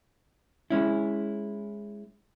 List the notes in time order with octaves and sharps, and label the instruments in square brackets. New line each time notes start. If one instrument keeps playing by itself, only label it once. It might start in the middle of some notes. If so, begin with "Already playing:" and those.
[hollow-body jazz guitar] G#3 C#4 E4